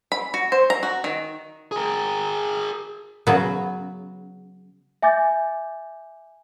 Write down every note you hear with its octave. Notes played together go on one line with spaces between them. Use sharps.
B5
F#4
C5
A#5
F#4
D#3
G#4 A#4
C#3 F#3 B3
E5 G#5 D6 G6 A6